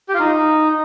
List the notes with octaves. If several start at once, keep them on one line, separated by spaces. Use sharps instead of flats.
G4
F4
D#4